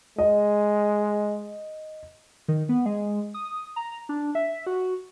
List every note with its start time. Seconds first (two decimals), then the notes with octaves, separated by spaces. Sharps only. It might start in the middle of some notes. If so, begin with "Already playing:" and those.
0.18 G#3 D#5
2.48 D#3
2.69 B3
2.86 G#3
3.34 D#6
3.76 A#5
4.09 D4
4.35 E5
4.66 F#4